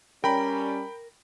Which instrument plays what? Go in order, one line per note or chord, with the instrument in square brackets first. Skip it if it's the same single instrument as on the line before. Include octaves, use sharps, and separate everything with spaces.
[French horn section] G3 C#4 [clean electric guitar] A#4 [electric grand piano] G5 B5